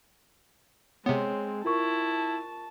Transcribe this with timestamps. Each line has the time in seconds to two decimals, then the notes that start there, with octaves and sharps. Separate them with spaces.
1.06 C3 G#3 B3 C4 C#5
1.65 E4 F4 A#4 A5 C#6